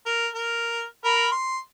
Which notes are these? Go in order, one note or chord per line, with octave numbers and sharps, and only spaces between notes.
A#4
A#4
A#4 B5
C6